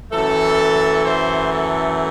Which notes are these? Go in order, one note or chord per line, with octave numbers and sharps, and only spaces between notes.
F#2 E3 A3 A4
C5
A4